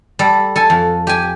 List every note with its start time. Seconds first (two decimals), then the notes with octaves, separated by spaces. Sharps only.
0.19 G3 A4
0.56 A4 G#5
0.70 F2
1.07 G4 G#5